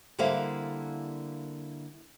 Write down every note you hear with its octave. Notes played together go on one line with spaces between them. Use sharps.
D3 G3 A#3 E4 C5 F5